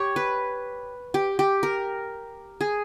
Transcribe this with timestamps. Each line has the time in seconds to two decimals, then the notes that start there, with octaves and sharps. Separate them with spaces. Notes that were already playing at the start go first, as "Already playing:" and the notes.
Already playing: G4 C#5
0.16 B4
1.14 G4
1.39 G4
1.63 A#4
2.61 G#4